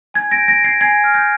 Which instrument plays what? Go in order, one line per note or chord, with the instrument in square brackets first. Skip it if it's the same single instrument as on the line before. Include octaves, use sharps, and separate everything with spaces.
[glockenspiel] G#5 G#6
A#6 D7
G6
A#6 D7
G6
G#6 C7
G#5 G#6 C7
F6
G6 A#6